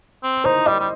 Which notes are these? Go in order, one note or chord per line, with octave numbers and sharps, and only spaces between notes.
C4
D#4 C5
G3 D#5
G3